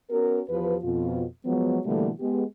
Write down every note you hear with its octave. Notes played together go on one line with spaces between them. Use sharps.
B3 C#4 F#4 A#4
E2 F3 G4 G#4 B4
F2 B2 F4
F3 F#3 G#3 B3
B2 D3 E3 G3 A3 A#3
G#3 B3 G4